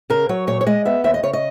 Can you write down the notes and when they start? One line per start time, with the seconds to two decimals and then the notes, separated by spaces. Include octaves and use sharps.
0.10 C#3 A#4
0.29 F#3 C#5
0.47 A#2 C#5
0.61 C#5
0.66 G#3 D#5
0.85 B3 E5
1.04 D#2 E5
1.14 D#5
1.23 C#3 C#5
1.33 D#5